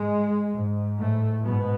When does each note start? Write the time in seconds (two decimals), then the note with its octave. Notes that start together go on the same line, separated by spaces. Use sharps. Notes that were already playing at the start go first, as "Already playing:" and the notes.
Already playing: G#2 G#3
0.54 G#2
0.99 A2 A3
1.44 G#2 B2 B3